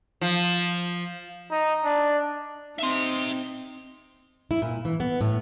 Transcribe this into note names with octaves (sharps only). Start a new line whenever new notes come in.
F3
D#4
D4
C4 D#4 E5 C6
E4
A#2
E3
B3
A2